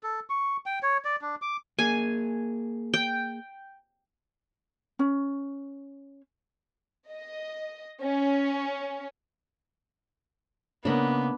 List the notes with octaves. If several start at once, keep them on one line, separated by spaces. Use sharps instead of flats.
A4
C#6
G5
C#5
D5
D4
D6
A#3 G#4 G#5
G5
C#4
D#5
C#4
C#3 A#3 B3 D4 D#5 B5